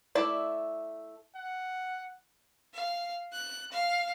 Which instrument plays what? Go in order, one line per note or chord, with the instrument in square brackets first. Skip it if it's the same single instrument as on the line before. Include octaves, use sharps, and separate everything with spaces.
[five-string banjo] A3 E4 D5 E5
[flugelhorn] F#5
[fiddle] F5
F#6
F5